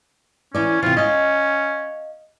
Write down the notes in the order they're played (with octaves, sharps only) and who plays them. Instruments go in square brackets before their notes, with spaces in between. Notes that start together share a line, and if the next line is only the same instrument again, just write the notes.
[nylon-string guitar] E3 D5 [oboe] C#4
[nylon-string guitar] C3 E3 [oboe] F4
[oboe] C#4 [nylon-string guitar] D#5 F5